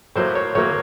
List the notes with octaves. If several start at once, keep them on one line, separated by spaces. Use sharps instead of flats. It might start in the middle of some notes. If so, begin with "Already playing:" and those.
A2 F#3 A#3 C5
C#5
A2 F#3 A#3 C#5